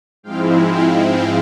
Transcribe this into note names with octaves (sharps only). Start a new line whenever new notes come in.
G#2 F3 G#3 C4 E4 F5 G5
F5 G5
F5 G5